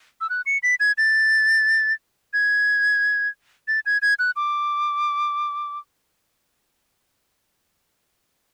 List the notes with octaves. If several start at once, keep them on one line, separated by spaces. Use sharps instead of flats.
E6
F#6
C#7
B6
G#6
A6
G#6
A6
G#6
G#6
F#6
D6